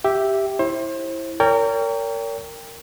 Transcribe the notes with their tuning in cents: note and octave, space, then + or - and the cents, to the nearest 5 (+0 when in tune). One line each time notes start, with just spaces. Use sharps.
G4 +0 E5 +0
E4 +0 C5 +35
A#4 -20 C#5 +40 G5 +15